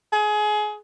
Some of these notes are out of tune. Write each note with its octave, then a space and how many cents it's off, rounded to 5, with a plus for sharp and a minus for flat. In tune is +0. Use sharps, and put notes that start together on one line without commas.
G#4 +25